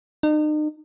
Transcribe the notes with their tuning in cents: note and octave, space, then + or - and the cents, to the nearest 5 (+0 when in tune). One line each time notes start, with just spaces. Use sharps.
D#4 -40